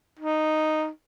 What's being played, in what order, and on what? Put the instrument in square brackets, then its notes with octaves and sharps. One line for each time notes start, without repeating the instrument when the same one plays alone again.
[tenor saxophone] D#4